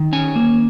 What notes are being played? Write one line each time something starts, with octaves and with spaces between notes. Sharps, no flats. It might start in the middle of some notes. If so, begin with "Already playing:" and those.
Already playing: D#3
C#4 G#5
A#3